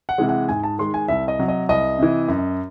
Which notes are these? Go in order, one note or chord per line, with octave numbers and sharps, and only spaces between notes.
F#5
C3 E3 G#3
F#5
G#2 G#5
A5
D#3 G#3 C6
G#5
C2 E5
D#5
C3 F#3
D#5
C2 D#5
C3 E3
F#2